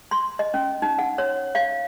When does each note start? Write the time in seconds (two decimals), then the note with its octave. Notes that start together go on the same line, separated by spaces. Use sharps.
0.11 C6
0.39 D#5
0.54 C#4
0.82 D#4
0.99 F#5
1.18 C#5
1.55 F5